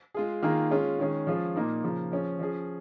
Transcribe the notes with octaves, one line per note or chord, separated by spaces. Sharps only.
G#3 F4 G#4
D#3 A#3 F4 G#4
G#3 C#4 F4 G#4
D#3 G#3 C#4 G#4
F3 G#3 C#4 F4 G#4
A#2 A#3 D#4
C#3 F3 A#3
F3 C#4 G#4
F3 C#4 G#4